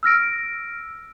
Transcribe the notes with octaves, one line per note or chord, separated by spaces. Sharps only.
E6 F6 A#6 D7